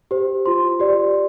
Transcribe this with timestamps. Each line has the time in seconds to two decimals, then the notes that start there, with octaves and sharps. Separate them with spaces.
0.11 G4 C5
0.45 F4 C5 C6
0.80 G4 D5